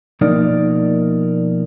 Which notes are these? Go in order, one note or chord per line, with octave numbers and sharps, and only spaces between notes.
B2 F3 A#3 D#4 A#4 D5